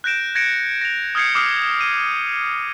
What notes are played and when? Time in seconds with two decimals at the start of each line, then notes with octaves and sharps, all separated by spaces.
0.04 F#6 G6 A#6 D7 E7
0.35 G#6 A#6 C#7 D7
0.81 A#6 F7
1.15 D#6 F6 G6 G#6 C7 C#7
1.35 D6 D#6 F6 C7
1.81 D#7